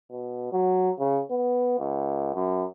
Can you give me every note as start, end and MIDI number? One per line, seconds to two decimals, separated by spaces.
0.11 0.49 47
0.52 0.90 54
0.99 1.21 49
1.31 1.75 59
1.79 2.31 37
2.34 2.65 42